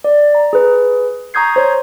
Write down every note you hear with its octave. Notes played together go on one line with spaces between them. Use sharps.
D5
A#5
G#4 B4
A#5 C#6 D#6 G6 G#6 C7
C5 C#5